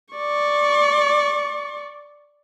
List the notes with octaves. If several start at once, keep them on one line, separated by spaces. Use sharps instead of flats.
D5 C#6